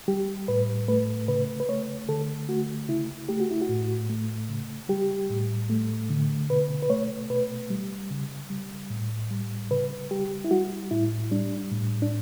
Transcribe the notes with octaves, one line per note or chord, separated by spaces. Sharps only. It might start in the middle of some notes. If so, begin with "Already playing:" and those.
G3 G4
A2 B4
A3 B4
C#3 B4
B4
A3 C#5
D3 A4
A3 F#4
C#3 E4
A3 G4
F#4
E4
F#4
A2
A3
C#3
G3 G4
A2
A3
D3
B2 B4
B4
A3 C#5
B2 B4
G3
C#3
G3
A2
G3
C#3 B4
G3 G4
E4
G3 F#4
A2 E4
G3 D4
A2
D4